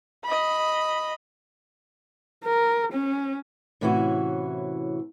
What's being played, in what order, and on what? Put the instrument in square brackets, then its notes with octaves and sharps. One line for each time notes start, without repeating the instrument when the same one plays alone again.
[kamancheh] D#5 B5
[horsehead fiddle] A#4
C#4
[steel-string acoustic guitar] A2 C3 E3 C#4 E4 F#4